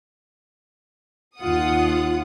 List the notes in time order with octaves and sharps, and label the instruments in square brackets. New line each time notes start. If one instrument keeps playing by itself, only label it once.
[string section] D#2 F4 F#5 D#6